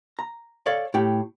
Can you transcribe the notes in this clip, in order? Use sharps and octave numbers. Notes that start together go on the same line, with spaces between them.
A#5
A4 C#5 D5 F5
A2 G4 G5